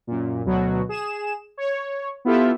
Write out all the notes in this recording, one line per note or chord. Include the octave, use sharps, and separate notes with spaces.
F#2 A#2
D2 B2 F#3 F#4
G#4 E7
C#5
B3 E4 F4 G4 A4 E5